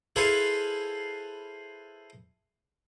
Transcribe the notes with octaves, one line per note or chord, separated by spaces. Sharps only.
E4 G#4 A4 B4 C5 F5